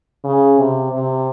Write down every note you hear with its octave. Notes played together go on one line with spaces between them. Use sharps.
C#3
C3
C3